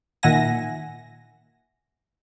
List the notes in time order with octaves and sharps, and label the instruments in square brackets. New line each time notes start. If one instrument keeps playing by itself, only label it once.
[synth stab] A#2 D#3 E5 F#5 G#5 A#6